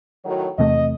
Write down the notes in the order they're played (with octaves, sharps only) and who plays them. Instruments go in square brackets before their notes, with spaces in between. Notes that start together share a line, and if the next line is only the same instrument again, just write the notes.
[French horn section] A2 D#3 F#3
[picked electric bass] E2 C3 A3 [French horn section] D#5